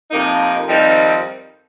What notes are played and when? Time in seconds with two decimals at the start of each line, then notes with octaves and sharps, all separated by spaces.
0.11 F2 C3 F3 A#3 D#4
0.68 F2 D#3 G3 C4 D#4